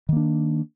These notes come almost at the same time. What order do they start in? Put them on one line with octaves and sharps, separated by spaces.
D#3 A#3 D4